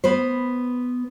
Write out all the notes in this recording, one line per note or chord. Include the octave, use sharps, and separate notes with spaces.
B3 B4 C5